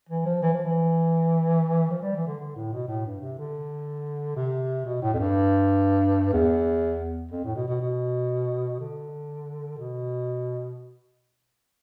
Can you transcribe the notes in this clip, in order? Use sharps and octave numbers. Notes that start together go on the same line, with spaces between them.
E3
F3
E3
F3
E3
F3
G3
E3
D3
D3
A2
B2
A2
G2
C3
D3
C3
B2
A2
F2
G2
E2
F2
A2
B2
B2
B2
D3
B2